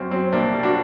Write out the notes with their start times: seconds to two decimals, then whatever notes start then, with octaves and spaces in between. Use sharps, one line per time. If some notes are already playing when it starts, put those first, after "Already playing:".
Already playing: F#2 F#3 C4
0.11 F#3 C4
0.32 C2 A#3 D4
0.53 G3
0.63 D4 F#4